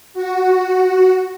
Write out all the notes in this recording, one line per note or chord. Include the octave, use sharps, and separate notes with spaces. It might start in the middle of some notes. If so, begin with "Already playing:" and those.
F#4